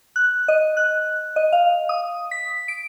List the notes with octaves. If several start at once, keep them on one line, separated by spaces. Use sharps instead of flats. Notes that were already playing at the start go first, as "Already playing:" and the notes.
F#6
D#5
F#6
D#5
F5
D#6
B6
D7